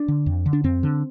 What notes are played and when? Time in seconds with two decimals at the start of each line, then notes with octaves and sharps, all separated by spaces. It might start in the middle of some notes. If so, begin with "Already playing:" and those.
Already playing: D4
0.08 D3
0.26 F2
0.46 D3
0.53 D4
0.64 F2 C4
0.83 D3